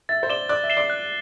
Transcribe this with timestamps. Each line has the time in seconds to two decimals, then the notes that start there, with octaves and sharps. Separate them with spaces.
0.09 E5 A6
0.23 C5
0.29 D5 E7 G7
0.49 D5 F#6
0.64 E5
0.70 C7 E7 G7
0.77 D5
0.90 F#6